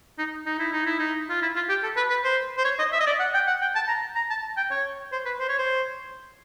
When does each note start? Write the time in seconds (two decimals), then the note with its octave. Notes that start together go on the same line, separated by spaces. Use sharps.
0.18 D#4
0.46 D#4
0.59 E4
0.72 D#4
0.86 E4
0.99 D#4
1.29 F4
1.42 E4
1.56 F4
1.69 G4
1.83 A4
1.97 B4
2.10 B4
2.24 C5
2.58 C5
2.65 C#5
2.79 D#5
2.92 E5
3.00 D#5
3.07 D5
3.20 F#5
3.34 G5
3.47 F#5
3.61 G5
3.75 A5
3.88 A#5
4.16 A#5
4.30 A5
4.57 G5
4.71 C#5
5.12 C5
5.25 B4
5.40 C5
5.49 C#5
5.58 C5